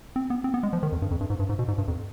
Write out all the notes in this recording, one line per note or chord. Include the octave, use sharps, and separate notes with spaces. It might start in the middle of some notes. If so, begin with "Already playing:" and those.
C4
B3
C4
B3
G#3
F3
D#3
F2
G2
F2
G2
G#2
G2
G#2
B2
G#2
G2
F2